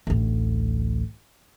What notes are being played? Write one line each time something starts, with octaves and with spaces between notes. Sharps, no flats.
A1 D2